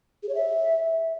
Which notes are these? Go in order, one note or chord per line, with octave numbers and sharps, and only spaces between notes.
G#4
C#5
E5